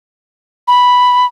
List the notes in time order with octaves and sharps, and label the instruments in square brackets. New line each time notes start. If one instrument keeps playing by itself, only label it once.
[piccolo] B5